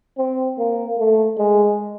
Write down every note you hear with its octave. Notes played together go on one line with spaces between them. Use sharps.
C4
A#3
A3
G#3